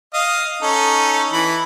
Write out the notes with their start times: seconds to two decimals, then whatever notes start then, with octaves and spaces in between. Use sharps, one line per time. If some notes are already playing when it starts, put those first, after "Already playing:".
0.13 D#5 F5
0.62 C#4 D#4 A4
1.32 E3 B5